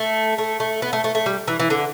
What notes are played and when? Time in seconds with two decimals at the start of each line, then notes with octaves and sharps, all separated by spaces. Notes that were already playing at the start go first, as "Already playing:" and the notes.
Already playing: A3
0.38 A3
0.60 A3
0.82 B3
0.93 A3
1.04 A3
1.15 A3
1.26 G3
1.48 E3
1.60 E3
1.70 D3